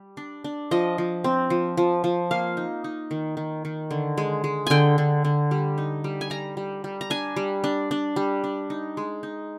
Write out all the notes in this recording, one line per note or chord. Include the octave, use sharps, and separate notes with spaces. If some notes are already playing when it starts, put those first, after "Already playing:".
Already playing: G3
D4
D4
F3 D#5
F3
C4
F3
F3
F3
A#3 F5
D#4
D#4
D#3
D#3
D#3
D3
G#3
G#3
D3 G5 G#5
D3
D3
G3
D#4
G3
G#5
G3 A#5
G3
G3
A#5
D4 G#5
G3
D4
D4
G3
D4
D#4
G#3
D#4